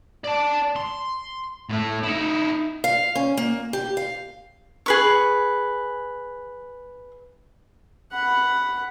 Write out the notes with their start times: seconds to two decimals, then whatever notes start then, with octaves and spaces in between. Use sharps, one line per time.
0.24 D5 A5
0.76 C6
1.69 A2 A3
2.03 D#4 E4
2.84 F5
3.15 C#4
3.37 A#3
3.73 G4
3.97 F5
4.86 G#4 B4 C#6
8.12 F#5 B5